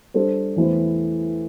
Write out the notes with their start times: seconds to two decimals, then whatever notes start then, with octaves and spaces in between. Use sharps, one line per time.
0.14 G3 D4 A4 C5
0.56 E2 E3 A3 E4 C5